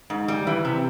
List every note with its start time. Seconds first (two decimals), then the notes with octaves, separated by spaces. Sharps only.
0.10 G#2
0.28 G3
0.47 E3
0.65 C3